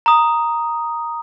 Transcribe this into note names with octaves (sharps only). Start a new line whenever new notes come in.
A#5 D#6